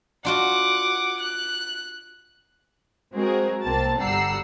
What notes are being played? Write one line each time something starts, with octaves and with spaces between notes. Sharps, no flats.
D4 F4 F#4 F#5 D6
F#6
G#3 C4 F#4 G#4 A#4
C2 A#3 C4 A5 A6
G1 G3 F#5 A#5 E6 C7